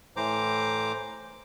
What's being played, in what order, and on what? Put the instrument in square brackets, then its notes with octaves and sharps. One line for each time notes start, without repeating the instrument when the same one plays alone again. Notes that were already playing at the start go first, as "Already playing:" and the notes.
[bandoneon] A2 E3 C5 A#5 D6